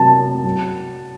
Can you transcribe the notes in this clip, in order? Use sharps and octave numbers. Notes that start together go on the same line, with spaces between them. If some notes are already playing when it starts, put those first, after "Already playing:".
Already playing: C3 F#3 A5
F#3